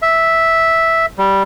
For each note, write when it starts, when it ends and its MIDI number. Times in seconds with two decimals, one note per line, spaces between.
0.02 1.06 76
1.18 1.43 55